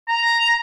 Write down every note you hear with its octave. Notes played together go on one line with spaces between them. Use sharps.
A#5